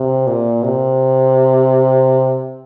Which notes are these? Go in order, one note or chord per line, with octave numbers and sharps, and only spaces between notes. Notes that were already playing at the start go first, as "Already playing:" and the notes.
Already playing: C3
A#2
C3